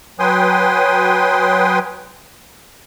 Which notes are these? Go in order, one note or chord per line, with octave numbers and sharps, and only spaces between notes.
F#3 B4 G5 G#5 C6 D#6